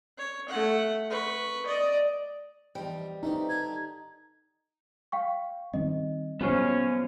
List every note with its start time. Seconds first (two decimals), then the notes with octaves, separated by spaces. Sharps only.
0.18 C#5
0.49 A3 F#5
1.10 B4 C#6
1.66 D5 D#5
2.75 E2 F3 G3 D#4
3.23 A3 B3 C4 D#4
3.50 D3 D4 G4 G#6
5.12 F5 G5 C#6
5.74 D#3 G3 C4 D#5
6.41 A#2 F#3 G3 B3 C#4 F4 C5